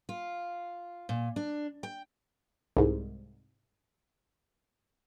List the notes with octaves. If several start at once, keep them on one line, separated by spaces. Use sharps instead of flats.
F4
A#2
D4
G5
C2 G#2